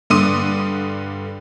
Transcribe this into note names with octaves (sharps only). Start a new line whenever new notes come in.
G2 D3 C6 D6 D#6 D#7